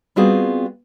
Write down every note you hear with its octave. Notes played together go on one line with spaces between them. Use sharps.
G3 B3 C4 F4 F#4 G#4